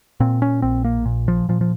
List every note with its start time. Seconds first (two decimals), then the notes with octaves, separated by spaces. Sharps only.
0.20 A#2 C4
0.42 C#4
0.62 A#1 C4
0.84 A#3
1.05 A#2
1.28 F3
1.49 A#2 F3
1.61 F3